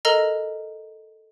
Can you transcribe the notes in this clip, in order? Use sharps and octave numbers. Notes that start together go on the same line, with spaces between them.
A4 A#4 D#5 A#5